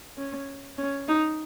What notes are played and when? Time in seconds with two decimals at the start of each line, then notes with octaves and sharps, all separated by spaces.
0.18 C#4
0.78 C#4
1.08 D#4